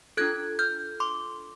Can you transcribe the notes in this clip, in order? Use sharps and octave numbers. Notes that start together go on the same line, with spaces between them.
D4 F4 A4 F#6 G#6
F6 G6
C6 D6